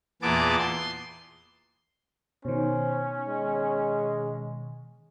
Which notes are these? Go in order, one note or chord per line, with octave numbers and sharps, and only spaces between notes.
E2 A#2 B3 G#4 A5 D6
C6
B2 D#3 C#4 C5
G#3